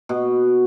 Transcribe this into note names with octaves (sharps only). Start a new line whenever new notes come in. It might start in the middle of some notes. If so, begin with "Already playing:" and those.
B2